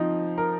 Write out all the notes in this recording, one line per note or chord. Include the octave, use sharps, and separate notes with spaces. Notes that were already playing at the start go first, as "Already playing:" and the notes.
Already playing: F3 C4 D#4
A#4